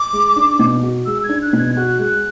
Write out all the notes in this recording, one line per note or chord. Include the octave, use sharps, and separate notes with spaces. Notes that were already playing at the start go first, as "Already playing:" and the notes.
Already playing: D6
G#3
D4
B2
F#4
G#3 E6
G#6
D4
F#6
B2
G#6
F#4 F#6
G#3